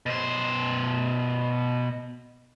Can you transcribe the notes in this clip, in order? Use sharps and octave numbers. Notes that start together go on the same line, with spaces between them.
B2 C5